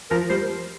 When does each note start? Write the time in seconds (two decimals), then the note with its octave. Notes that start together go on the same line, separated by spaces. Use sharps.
0.10 F3 A#4
0.29 G3 C5